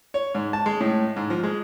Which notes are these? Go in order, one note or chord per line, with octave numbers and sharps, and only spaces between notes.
C#5
G#2
A5
G#3
A2
G#2
F3
G#3